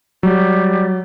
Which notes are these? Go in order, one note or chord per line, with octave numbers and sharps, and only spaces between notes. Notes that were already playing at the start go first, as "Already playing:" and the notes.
F#3 G3